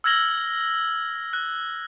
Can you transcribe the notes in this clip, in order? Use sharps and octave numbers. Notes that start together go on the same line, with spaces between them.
E6 F6 G#6 A#6 F#7 G7
F#6